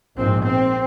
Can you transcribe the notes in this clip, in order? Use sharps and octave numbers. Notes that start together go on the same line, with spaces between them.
A#1 G#2 C4
C4